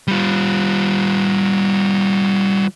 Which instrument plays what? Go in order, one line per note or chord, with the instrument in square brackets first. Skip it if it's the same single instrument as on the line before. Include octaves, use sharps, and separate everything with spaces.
[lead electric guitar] G3 F4